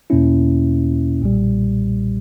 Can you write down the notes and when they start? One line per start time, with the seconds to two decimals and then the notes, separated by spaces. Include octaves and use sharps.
0.10 E2 B2 A#3 C#4 E4
1.21 B1 A#2 G3